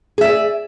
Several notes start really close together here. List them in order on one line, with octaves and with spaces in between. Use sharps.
G#4 E5 D5